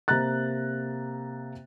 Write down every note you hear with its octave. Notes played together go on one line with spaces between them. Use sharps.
C3 A#3 A#5 F#6 A6